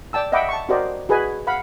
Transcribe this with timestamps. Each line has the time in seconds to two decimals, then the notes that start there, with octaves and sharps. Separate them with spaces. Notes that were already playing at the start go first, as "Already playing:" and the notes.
0.13 D5 G5 A5 E6
0.32 D#5 E5 F#5 G5 B5 D6
0.49 A5 C#6
0.69 F#4 G4 A#4 C5 D5 D#5
1.09 F#4 G#4 B4 D#5 G#5
1.47 F5 F#5 B5